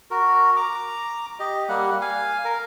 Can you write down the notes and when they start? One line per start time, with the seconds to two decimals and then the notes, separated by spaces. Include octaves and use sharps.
0.11 F#4 A#4
0.56 A#5 D6
1.39 G4 D#5
1.69 G3 A#3 F#5
2.01 F5 G#5
2.45 A#4